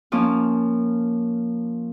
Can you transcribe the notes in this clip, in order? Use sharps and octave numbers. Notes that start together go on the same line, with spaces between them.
F3 A#3 C#4 F4